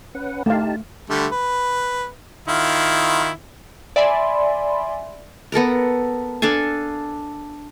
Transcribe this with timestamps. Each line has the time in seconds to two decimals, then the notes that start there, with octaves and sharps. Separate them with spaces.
0.15 C#4 B4 F#5
0.46 A3 D#4 G4 F5 A5
1.10 D3 G3 A3
1.32 B4
2.48 D#3 E4 F4
3.96 D5 E5 G#5 B5 C6
5.52 B3 A4 A#4 A#5
6.42 D4 A4 F5 G#5